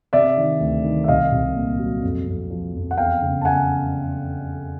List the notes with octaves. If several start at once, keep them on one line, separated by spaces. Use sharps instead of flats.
C3 D5 E5
D#3
D2
D#3
E5
C2 D#5 F5
C2
A#2
F#3
F2
F2
F3
F2
F#5
E2 F5 G5
C#3
A5
C#3 F#5 G#5